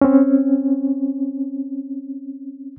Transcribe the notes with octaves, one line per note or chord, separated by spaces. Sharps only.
C4 C#4